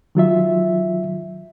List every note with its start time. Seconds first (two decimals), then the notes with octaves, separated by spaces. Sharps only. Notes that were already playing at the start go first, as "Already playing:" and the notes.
0.15 D#3 F#3 F4 E5